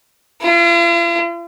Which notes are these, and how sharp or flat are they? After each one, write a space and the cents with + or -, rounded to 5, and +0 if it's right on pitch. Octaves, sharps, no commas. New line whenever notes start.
F4 -45